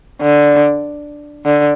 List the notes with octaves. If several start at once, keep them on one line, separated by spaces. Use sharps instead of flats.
D3
D3